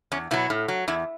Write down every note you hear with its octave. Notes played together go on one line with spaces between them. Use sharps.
E2 C#4
B2 F#3 E4
A2
F#3
E2 E4